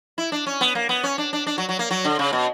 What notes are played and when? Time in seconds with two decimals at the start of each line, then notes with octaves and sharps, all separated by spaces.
0.18 E4
0.32 D4
0.46 C#4
0.61 B3
0.75 A#3
0.89 B3
1.03 C#4
1.18 D4
1.33 D4
1.47 D4
1.58 F#3
1.69 F#3
1.79 A#3
1.91 F#3
2.05 D3
2.19 C#3
2.33 B2